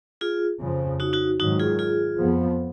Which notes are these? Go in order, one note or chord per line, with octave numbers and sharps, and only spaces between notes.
F4 G#4
F2 C#3 F3
D#4 F#4
D#4 F#4
G#2 D#3 F#3 D#4 F#4
F4 G#4
F4 G#4
F2 F3 B3